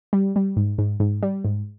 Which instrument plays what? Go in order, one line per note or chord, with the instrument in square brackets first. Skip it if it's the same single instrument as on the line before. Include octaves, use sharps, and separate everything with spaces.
[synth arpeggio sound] G3
G3
G#2
G#2
G#2
G3
G#2